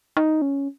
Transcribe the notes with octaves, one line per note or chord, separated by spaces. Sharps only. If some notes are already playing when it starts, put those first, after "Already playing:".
D#4
C#4